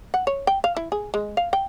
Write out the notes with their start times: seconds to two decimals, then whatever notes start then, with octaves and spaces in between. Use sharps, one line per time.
0.14 F#5
0.27 C#5
0.47 G5
0.64 F5
0.77 E4
0.92 G#4
1.14 G#3
1.37 F5
1.53 G5